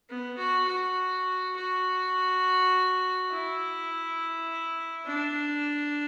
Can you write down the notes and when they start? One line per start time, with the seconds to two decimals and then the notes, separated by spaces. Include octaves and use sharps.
0.09 B3
0.38 F#4
0.68 F#4
1.56 F#4
3.31 E4
5.06 D4